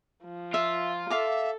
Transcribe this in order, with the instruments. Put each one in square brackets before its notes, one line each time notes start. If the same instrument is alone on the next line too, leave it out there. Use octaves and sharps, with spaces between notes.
[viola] F3
[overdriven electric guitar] F4 [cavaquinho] E5
[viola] A4 [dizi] E5 [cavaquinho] F5 D6